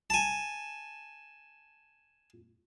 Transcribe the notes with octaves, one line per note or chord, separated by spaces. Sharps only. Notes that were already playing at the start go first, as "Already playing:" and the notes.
G#5 A5